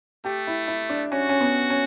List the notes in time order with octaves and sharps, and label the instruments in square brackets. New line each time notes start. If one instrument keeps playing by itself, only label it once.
[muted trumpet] A3 [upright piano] G4
[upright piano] E4
E4
D4
[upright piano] C#4 [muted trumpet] F#4
[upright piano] C#4
B3
C#4